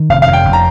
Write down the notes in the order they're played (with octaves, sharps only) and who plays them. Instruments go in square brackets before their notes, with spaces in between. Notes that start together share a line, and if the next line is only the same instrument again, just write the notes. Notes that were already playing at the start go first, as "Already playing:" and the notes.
Already playing: [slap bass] D#3
[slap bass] F1 [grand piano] F5
[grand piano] F5
[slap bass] F2
[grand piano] G5
[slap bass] F1
[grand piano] A#5